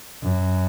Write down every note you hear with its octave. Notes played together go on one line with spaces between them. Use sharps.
F#2